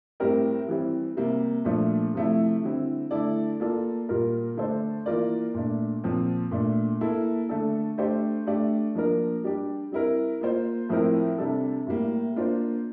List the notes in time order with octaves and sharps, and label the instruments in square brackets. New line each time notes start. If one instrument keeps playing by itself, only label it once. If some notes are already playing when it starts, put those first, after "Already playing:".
[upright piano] A2 G3 C4 G4 A#4
E3 G3 C4
C3 G3 A#3
A#2 F3 A3 D4
C3 F3 A3 E4
D3 G3 C4 E4
D3 A3 E4 A4 D5
A#3 F4 A4 D5
A#2 G3 A#3 F4 A#4
D3 A3 D4 A4 C5
E3 A#3 F4 A#4 D5
A#2 A3 D4
A#2 F3 C4
A#2 A3 D4
A#3 E4 A4
D3 A3 D4 A4
A3 D4 G4 C5
A3 D4 G4 D5
F3 A#3 D4 F4 A#4
G3 D4 G4
G3 C4 E4 A#4
A#3 F4 C5
A2 F3 C4 E4 A#4
C3 G3 D4 A4
A2 G3 A#3
A#3 D4 F4 C5